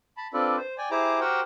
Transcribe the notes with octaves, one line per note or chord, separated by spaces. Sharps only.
A5 B5
C4 D4 F4 A4 B4 D5
C5
D5 G5 G#5
E4 G4 G#4 C5 A#5 D6
F#4 G4 A#4 C5 F#5 G5